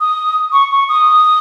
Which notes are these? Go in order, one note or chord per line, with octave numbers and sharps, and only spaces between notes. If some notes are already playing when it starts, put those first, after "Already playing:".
D#6
C#6
C#6
D#6